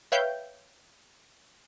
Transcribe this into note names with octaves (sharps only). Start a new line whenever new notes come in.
B4 C#5 E5 F5 G5 G6